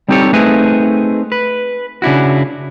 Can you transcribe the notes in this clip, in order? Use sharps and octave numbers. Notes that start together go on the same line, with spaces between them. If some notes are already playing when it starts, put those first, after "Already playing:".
G3 C4 D#4 G4 A4 C#5
A3 C4 D#4 G#4 B4 D#5
B4
C#3 D4 E4 F#4